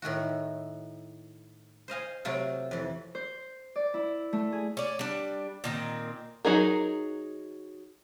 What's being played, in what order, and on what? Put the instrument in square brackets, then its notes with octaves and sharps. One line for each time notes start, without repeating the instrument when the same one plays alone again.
[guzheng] A2 D#3 A3 F#4
C5 D#5 F5 G#5
C3 F#3 A3 F4
F2 E3
[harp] C5
D5
E4
A3
G#4
[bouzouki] C#4 D5
G3 D4
A#2 D#3 C4
[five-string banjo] F#3 D#4 G#4 A#4